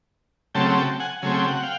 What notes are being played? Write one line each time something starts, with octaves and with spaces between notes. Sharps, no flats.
C#3 F#3 A3 C4 G5 A5
G5 A5
F#5 G#5
C#3 F#3 A3 C4 G#5
G5
F#5
F5 G5